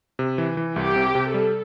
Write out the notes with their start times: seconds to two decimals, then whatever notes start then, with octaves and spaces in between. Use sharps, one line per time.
0.19 C3
0.38 E3
0.57 E3
0.76 C2 G4
0.96 C3
1.15 C3
1.34 G3 A4